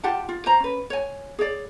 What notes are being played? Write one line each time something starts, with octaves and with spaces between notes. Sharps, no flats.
F4 G4 F#5 A5
F4
C5 A#5
C#4 B4
C#5 G#5
G#4 C#5 D5